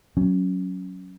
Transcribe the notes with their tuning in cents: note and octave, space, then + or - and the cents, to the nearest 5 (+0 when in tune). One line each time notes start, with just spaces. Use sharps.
F#3 +0 C#4 +0